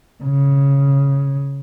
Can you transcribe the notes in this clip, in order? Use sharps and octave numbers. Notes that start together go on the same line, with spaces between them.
C#3